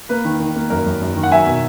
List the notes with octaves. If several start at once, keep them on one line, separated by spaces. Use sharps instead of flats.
A#3 B4
D#3
D#3
A#3
F#2 A#4
F#2
F#2
D#3
F#5
F#3 E5 G#5
B2